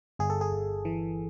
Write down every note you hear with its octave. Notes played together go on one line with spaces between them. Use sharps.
G1 G#4
A4
G#4
G1
E3